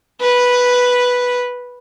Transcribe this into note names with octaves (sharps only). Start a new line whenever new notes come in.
B4